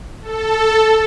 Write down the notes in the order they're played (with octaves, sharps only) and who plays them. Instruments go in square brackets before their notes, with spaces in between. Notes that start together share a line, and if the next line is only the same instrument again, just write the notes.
[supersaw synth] A4